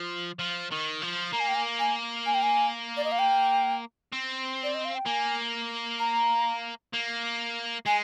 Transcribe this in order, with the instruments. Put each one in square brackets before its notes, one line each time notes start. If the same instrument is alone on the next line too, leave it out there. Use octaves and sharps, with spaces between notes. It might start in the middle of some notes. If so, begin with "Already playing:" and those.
Already playing: [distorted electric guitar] F3
F3
D#3
F3
[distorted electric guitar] A#3 [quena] A#5
[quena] G#5
G5
G#5
G#5
G#5
G5
G#5
D5
D#5
F5
G5
[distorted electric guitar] C4
[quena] D5
D#5
F5
G5
[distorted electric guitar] A#3 [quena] G#5
[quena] A#5
[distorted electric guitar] A#3
[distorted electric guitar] G#3 [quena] G#5